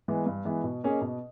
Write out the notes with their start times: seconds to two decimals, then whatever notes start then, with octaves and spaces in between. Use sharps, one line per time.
0.08 E3 G#3 B3
0.26 G2
0.45 E3 G#3 B3
0.64 B2
0.84 A#3 C#4 G#4 D#5
1.02 B2